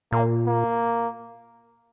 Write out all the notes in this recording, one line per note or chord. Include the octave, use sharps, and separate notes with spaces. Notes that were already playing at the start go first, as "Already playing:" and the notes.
A#2 A#3
A#3